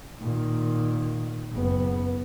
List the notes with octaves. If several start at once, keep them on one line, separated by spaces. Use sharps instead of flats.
A#2 D#3
F#1 B3